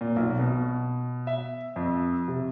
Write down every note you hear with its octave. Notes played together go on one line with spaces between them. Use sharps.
A#2
B1
B2
E5
F2
C3